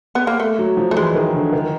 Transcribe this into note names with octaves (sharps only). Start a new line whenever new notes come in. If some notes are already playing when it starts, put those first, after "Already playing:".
B3
A#3
A3
F#3
F3
A3
E3 G#3
D#3
D3
D#3